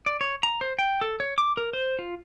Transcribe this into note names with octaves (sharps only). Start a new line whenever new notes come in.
D5
C#5
A#5
C5
G5
A4
C#5
D6
A#4
C5
F4